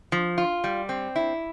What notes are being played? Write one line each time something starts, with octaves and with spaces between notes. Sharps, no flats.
F3
F4
G3
C4
E4